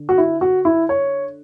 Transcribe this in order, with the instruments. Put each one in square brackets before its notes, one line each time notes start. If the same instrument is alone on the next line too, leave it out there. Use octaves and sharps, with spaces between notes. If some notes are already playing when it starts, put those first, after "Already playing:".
Already playing: [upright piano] D3
F#4
E4
F#4
E4
C#5